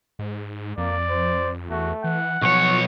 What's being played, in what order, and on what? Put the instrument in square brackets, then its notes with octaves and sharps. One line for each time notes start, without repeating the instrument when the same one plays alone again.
[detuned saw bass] G#2
[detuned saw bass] F2 [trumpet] A#3 [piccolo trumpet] D5
[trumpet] C5
[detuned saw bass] E2 [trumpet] A3 [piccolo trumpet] F#4
[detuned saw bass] E3 [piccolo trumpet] F#5
[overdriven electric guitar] B1 C#5 [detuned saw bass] F3 [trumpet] C#6